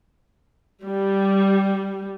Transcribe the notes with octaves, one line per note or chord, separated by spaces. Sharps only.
G3